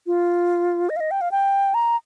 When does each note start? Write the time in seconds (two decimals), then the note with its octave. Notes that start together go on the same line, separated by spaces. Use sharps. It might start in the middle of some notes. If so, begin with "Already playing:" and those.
0.07 F4
0.89 D#5
0.96 F5
1.00 D#5
1.11 G5
1.21 F5
1.31 G5
1.74 A#5